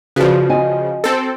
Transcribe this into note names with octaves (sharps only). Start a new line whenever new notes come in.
C#3 F3 F#4 B4 D5
D#5 G#5
C4 A4